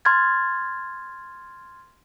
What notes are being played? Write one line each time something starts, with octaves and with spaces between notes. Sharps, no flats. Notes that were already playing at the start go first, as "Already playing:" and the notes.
C6 F6 G#6 A6